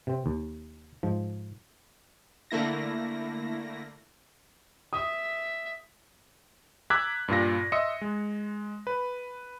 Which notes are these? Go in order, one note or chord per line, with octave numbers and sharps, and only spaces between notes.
C3 C4
D#2
G#2 F3
D3 A3 A#3 E4 A#6
E5 D#6
A#5 D6 E6 F#6 G#6 B6
G2 A#2 F4 A#6
D#5 E5 C6 D#6 E6 C#7
G#3
B4